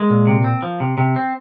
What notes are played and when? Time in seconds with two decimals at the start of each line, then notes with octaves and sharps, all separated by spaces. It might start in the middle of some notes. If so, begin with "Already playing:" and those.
Already playing: G#3 A#4
0.10 A#2
0.27 C3
0.44 C4
0.62 F3
0.80 C3
0.98 C3
1.16 C4